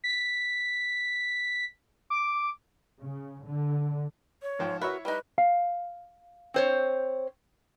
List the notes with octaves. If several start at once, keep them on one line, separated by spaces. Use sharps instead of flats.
B6
D6
C#3
D3
C#5
G#2 F3 G5
E4 F#4 A#4 B4 C#5 E5
G3 D#4 B4
F5
C4 C5 C#5